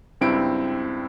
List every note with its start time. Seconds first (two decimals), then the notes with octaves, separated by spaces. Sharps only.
0.21 C#2 G2 C4 E4 D7